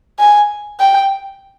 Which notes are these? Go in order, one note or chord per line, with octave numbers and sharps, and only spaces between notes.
G#5
G5